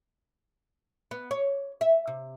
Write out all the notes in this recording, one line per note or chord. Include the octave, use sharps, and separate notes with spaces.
B3
C#5
E5
C3